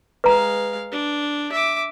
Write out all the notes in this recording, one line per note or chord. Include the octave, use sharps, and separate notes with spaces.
G#3 B4 F5 A#5
D4
E5 D6